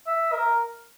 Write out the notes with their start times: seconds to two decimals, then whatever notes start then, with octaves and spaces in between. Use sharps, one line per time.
0.07 E5
0.32 A#4